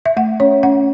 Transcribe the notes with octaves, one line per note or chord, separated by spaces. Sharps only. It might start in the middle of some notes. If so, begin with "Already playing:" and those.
E5
A3 F#5
C#4 C#5
C#4 F#5